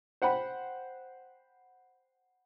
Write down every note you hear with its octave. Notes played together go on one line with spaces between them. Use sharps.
C5 F#5 G5 B5